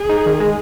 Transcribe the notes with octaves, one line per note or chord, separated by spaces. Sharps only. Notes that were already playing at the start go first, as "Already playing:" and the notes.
Already playing: G#4
D#4
D#3
G#3